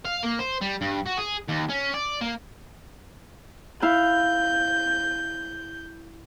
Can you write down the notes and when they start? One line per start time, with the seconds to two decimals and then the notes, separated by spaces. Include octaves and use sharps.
0.05 F5
0.23 A#3
0.39 C5
0.62 G3
0.82 G2
1.07 F#4
1.18 G#4
1.49 D#2
1.70 C#4
1.94 D5
2.21 A#3
3.82 E4 F5 G6